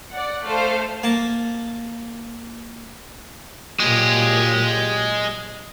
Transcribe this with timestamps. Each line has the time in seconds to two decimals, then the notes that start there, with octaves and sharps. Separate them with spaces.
0.12 D5 F#5
0.45 A3 A4 C5 F5
1.03 A#3 A5
3.80 A#2 F#3 G#3 G4 G#4